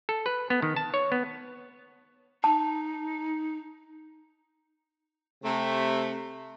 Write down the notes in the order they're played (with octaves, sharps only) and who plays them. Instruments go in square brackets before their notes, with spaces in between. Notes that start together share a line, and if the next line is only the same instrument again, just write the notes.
[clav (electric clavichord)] A4
B4
B3
D#3
A5
C#5
B3
[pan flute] D#4 [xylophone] A5
[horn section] C3 A3